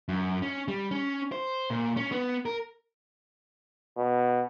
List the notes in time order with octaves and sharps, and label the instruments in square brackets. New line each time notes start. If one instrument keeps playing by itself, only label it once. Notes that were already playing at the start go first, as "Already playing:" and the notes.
[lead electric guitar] F#2
C#4
G3
C#4
C5
A#2
C#4
B3
A#4
[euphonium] B2